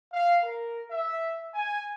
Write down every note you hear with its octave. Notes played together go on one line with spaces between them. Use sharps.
F5
A#4
E5
G#5